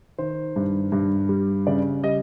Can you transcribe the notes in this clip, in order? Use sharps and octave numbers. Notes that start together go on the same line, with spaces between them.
D#3 C5
G2
G2
G3
C#3 D5
G3 D#5